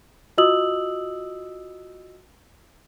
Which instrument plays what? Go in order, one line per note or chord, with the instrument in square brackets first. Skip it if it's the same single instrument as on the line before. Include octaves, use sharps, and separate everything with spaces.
[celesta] F4 F#4 D#5 D#6 E6 F#7